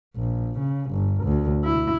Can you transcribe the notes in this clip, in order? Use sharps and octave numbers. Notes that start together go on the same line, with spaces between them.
A#1
C#3
G1
D2
E4